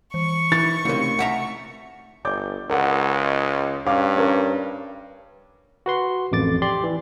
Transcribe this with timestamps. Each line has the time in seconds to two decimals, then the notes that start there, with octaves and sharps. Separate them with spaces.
0.14 E3 C#6 C#7
0.52 E3 D#4 A6
0.85 C#2 C3 A3 D#4 A#4
1.19 C2 E5 F#5 A#5
2.25 G1 D5 D6 G6
2.70 C#2 A#4 F#5
3.86 G2 C#4 F5 D6
4.17 C#4 A#4 B4
5.86 F#4 B4 C6
6.32 A1 F2 D6 A6
6.62 G4 D5 C6
6.83 E3